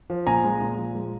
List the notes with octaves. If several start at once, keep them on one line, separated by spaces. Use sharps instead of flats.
F3
A#2 G#5 A#5
G#3
A#2
F3
G#3